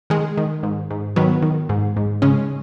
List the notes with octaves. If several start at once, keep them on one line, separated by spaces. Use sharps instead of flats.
D#3 G#3
D#3
G#2
G#2
D#3 F#3 B3
D#3
G#2
G#2
C#3 G#3 C#4